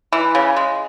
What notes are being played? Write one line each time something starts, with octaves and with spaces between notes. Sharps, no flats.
E3
C#3
G#3